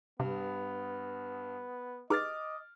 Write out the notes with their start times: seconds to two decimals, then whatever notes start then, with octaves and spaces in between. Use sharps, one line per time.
0.20 G2 C3 B3
2.10 D#4 G#4 B4 D#5 D6 F6 A6